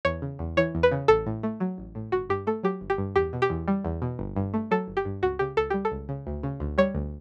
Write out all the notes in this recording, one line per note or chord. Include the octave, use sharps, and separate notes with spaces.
E2 C#5
C#3
E2
E3 C#5
E2
B4
C#3
A1 A4
A2
A3
F#3
A1
A2
G1 F#4
G2 G4
A3 A4
F#3 G4
G1
G4
G2
E2 G4
B2
G4
E2
G3
E2
B2
G1
G2
A3
F#3 A4
G1
G4
G2
C#2 F#4
C#3 G4
C#2 A4
G3 G4
A4
C#2
C#3
D2
C#3
D2
G3 C#5
D2